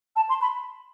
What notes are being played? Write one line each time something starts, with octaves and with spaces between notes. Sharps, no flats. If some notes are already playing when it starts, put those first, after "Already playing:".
A5
C6
B5